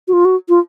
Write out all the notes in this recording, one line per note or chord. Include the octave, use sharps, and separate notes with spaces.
F#4
F4
F#4
F4